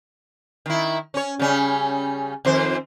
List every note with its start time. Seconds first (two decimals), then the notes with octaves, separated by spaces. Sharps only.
0.66 D#3 E4
1.14 C#4 C#5
1.39 C#3 G3 C#4
2.45 F2 D#3 C5